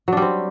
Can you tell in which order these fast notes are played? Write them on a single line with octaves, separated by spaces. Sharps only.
F#3 D4 G3 C4